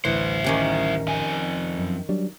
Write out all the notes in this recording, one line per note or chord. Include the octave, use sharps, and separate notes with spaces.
A1 D2 E3 E4 C5
D#3 C#4 G4
F2 G#5
F#2
F#3 G3 D4